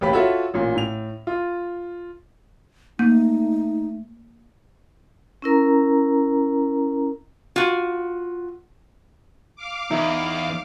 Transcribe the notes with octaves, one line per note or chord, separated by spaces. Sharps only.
A1 D#2 G4 B4 B5
F4 F#4 A4 C#5 E5 F#5
A1 A#2
A2 F7
F4
A3 A#3 D#4
C#4 E4 A#4 A#5
F4 F#4
F5 D6
E2 D#4 E5